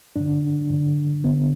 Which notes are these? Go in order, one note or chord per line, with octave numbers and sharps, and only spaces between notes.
G2 D3 D4
G2 D3
G2 D3 B3